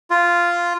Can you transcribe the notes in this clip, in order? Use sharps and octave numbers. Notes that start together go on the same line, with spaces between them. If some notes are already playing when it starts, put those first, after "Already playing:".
F4